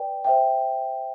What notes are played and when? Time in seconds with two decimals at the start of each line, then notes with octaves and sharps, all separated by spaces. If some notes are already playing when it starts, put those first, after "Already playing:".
Already playing: B4 D5 G5
0.25 C5 E5 G5